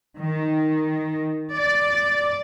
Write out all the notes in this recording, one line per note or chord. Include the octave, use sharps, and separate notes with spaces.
D#3
D5